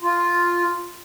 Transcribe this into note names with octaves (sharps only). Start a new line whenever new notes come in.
F4